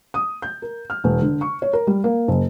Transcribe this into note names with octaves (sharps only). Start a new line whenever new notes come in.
D#6
G6
A#4
F6
E1
D3
C#6
C#5
A#4
G3
A#3
F#1